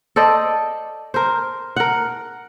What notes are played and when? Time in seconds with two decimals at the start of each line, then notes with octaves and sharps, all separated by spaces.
0.16 A4 C5 D5 D#5
1.14 A#4 C5
1.76 A#4 F#5